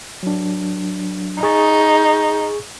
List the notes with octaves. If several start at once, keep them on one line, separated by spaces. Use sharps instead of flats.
F#3 D4
D#4 G#4 C#6 A6